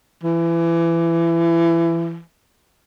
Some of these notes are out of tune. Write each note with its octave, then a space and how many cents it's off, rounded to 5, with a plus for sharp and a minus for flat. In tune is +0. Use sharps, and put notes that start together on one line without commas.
E3 +25